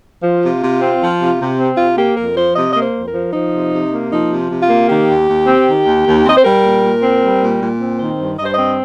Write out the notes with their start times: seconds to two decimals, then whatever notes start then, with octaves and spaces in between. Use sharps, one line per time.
0.23 F3 F4
0.42 C3
0.62 C3
0.81 C4
1.01 F3
1.20 C3
1.40 C3
1.59 C4
1.78 C3 F4
1.98 A#3 G4
2.17 F2 A#4
2.36 F3 C5
2.56 C3 D#5
2.73 A#3 D#5
2.82 C5
2.94 F2
3.08 A#4
3.14 F3
3.33 F3 D#4
3.54 C3
3.73 C3
3.92 A#3
4.12 F3 D#4
4.30 C3
4.50 C3
4.63 F4
4.70 A#3
4.89 D#3 G4
5.09 D#2
5.28 D#2
5.47 C4
5.67 D#3
5.86 D#2
6.05 D#2
6.25 C4 D#5
6.37 C5
6.44 G3 A#4
6.64 A#2
6.83 A#2
7.03 C4
7.22 G3
7.42 A#2
7.61 A#2
7.80 C4
7.99 D#3 C5
8.19 G2
8.38 G2 D#5
8.46 C5
8.53 D#5
8.59 C4